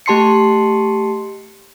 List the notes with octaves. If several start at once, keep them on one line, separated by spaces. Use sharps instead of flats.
A3 G4 A5 C6 C7 C#7